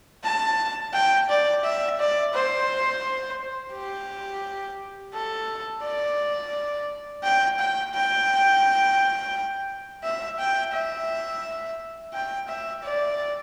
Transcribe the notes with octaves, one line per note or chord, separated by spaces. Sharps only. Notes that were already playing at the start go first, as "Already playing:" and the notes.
A5
G5
D5
E5
D5
C5
G4
A4
D5
G5
G5
G5
E5
G5
E5
G5
E5
D5